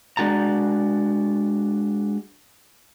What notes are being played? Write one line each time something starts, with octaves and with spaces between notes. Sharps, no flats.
G#3 D4 F#4 A5 A#5